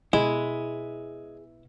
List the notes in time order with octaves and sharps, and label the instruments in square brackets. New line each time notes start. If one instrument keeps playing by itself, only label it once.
[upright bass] B2 [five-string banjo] G#3 [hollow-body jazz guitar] E4 [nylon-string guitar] G#4